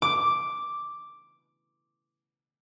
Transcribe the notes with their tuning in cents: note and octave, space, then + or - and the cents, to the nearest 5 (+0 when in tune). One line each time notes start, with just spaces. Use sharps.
D6 +0